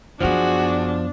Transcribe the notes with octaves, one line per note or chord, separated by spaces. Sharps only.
F#2 F3 B3 D4 F#4 G#4